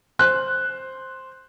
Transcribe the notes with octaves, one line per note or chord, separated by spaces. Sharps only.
C5 F#6